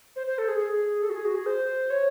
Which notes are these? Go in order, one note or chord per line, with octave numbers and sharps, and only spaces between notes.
C5
C5
A4
G#4
G#4
A4
F#4
G#4
F#4
G#4
C5
C#5